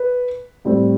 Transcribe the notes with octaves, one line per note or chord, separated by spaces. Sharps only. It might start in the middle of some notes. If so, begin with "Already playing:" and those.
Already playing: B4
A2 G3 C4